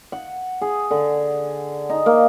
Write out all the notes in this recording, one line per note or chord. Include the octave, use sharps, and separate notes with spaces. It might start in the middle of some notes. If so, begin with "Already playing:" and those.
F#5
G#4
D3
D#4
A#3